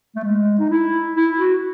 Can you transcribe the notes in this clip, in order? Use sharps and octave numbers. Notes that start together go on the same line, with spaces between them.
A3
G#3
D#4
E4
E4
F#4